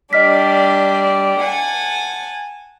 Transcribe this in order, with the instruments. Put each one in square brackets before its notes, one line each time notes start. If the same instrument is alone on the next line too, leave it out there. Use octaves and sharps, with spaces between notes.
[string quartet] G3 D4 G4 [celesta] D#5 F6 B6
[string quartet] F#5 G#5 A5